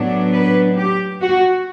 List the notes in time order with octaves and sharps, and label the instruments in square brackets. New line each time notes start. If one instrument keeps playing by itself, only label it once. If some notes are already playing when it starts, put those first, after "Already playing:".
Already playing: [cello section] A2 F#3 B3 D4
B4
G4
F#4